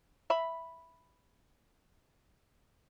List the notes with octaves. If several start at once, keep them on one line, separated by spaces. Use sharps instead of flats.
E5 B5